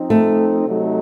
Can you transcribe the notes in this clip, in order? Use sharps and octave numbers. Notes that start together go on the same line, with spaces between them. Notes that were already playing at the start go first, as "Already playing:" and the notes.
Already playing: F3 C4 D#4
A3
C3 F#3 A3 D#4